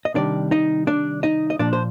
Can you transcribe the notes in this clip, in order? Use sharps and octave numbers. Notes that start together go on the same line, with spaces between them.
D#5
C3 D#3 G3 D4 D5
D#4 D#5
D4 D5
D#4 D#5
D#5
A#2 F3 D4 D5
C5